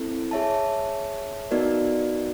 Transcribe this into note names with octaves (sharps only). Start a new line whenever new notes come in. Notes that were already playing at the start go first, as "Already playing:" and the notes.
Already playing: C4 E4 A4
G#4 C#5 E5 A5
B3 D#4 F#4 A#4 D5